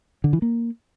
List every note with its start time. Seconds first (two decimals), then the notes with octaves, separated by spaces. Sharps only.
0.24 D3
0.33 E3
0.42 A#3